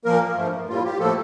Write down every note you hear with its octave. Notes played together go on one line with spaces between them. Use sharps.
A#2 F3 A#3 A#4
G2 F3 A3
A2 G3 A#3 F4
G4
A2 F3 A3 A#3 A4